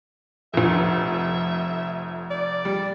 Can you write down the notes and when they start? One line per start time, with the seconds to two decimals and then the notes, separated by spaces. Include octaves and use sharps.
0.54 F1 F2 E5
2.31 D5
2.65 G3